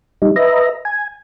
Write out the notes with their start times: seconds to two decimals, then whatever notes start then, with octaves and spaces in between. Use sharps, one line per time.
0.22 G3 D#4
0.36 B4 D#5 E5 A#5
0.85 G#5